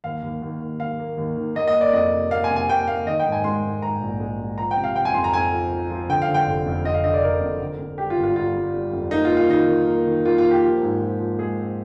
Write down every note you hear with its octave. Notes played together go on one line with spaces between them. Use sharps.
D#2 F5
D#2
D#2
D#2
D#3 F5
A#3
D#2
D#3
A#3 D#5
D#5
A#3
D5
F2 D#5
C3
A#3 F5
G#5
C3
G#5
A#3 G5
A#3 F5
D#3 D#5
G5
G#2
G#5
G#3 C6
G#2
G#2 A#5
A#1
G#3
G#3
F3 A#5
G5
C3
F5
C3 G5
G#5
F2 C6
A#5
F2 G#5
F3
F3
F3
D3 G5
F5
D3
G5
F1
F2
F2 D#5
F5
D3 D#5
D5
D3 A#4
F2
D3
F2
G3 G4
F4
G1
F4
G1 F4
G3
G3
F2
A#3 D#4
F4
A#3
F4
D#3 D#4
D#3
A#3
D#3
A#3 F4
F4
A#3
G4
F3
G#2
F3
F3
G#3 G#4
C4